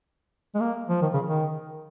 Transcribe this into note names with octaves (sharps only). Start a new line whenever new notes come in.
G#3
A#3
F3
D#3
C#3
D#3